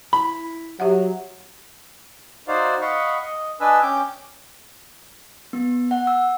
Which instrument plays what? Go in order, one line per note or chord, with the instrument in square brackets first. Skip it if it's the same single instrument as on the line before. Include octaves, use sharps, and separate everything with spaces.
[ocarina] E4 [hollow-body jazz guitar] B5
[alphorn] F#3 [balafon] G4 E5 F#5
[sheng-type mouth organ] D#4 F#4 C5 D5 F5
D#5 F5 F#5 B5 C#6
D#5
D4 B4 D#5 G#5 E6
C#4 G5 D6 G6
[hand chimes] B3
F#5
E6